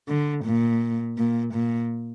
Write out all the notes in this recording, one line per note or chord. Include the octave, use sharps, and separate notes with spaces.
D3
A#2
A#2
A#2